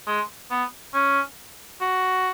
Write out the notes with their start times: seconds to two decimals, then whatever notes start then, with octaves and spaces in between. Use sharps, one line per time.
0.07 G#3
0.51 B3
0.94 C#4
1.81 F#4